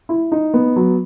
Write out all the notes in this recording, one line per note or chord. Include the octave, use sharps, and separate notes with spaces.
E4
D#4
B3
F#3